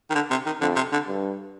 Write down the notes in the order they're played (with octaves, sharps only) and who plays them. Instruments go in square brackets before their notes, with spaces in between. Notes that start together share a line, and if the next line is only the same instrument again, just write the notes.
[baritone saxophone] D#3
D3
C3
D#3
[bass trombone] F2 [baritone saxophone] D3
[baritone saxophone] C3
D3
[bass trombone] G2